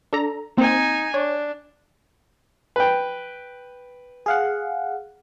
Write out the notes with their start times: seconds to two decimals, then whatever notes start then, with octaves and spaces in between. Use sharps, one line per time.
0.13 D4 A4 A#5
0.57 A#3 C4 D#4 G#5
1.14 D4 C#5
2.76 B4 G5
4.26 G#4 F5 F#5